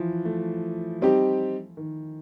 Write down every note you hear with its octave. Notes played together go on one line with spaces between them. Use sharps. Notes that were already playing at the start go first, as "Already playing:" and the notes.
Already playing: E3 F3
A3
G3 C4 D#4 G4
D#3